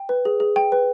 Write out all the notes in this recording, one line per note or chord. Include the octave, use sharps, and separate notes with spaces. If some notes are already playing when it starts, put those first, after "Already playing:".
Already playing: G5
B4
G#4
G#4
G5
B4